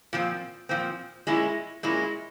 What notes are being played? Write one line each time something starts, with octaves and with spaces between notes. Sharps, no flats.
A#2 F3 C4
A#2 F3 C4
A#2 G#3 C#4 E4
A#2 G#3 C#4 E4